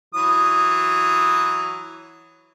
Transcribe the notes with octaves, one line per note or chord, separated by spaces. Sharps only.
E3 F#3 D#6